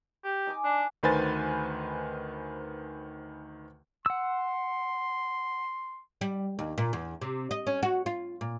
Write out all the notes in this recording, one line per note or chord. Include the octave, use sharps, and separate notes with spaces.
G4
D#4 G#5 D6
D4
D2 D#3 B4 C5 G#5 A6
F#5 C6 E6
G3
D#2
A#2
E2
C3
D#5
C#4
F#4
F4
A#2